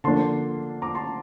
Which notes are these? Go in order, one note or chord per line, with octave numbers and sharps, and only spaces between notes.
D3 F3 A#3 D4 A5 C6
A#5 D6
A5 C6